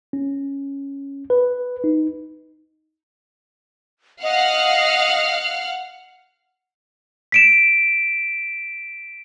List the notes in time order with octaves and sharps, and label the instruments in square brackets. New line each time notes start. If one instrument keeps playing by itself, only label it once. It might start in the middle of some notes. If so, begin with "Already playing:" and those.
[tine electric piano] C#4
B4
D#4
[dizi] D#5 [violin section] F5 F#5 F6
[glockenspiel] B6 D7 E7